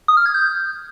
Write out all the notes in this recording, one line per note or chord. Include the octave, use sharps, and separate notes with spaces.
D#6
F6
G#6
G6